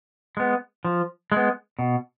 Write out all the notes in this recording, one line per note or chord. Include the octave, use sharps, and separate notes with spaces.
G#3 B3
F3
G#3 B3
B2